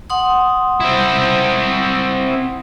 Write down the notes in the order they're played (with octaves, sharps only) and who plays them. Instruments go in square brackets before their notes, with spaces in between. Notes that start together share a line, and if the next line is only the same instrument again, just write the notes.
[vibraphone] F#5 C6 D#6
[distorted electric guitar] C4 E4